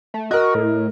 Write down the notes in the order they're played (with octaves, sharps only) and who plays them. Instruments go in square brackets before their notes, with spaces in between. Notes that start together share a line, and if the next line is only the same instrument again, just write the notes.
[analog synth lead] A3
[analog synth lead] F#4 [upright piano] A#4 D#5
[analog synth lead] A2